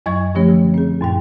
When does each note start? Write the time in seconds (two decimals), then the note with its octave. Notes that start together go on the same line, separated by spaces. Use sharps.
0.06 F#2 F#3 D#5 C#6 G#6
0.35 D3 F3 A3 C#4 G4 C#5
0.49 D#3
0.74 C4 G#4
1.01 F#2 A#2 G5